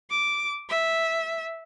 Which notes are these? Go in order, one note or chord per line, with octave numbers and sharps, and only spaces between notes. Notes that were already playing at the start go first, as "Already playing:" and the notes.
D6
E5